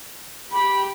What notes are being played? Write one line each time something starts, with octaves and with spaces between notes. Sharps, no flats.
G4 B5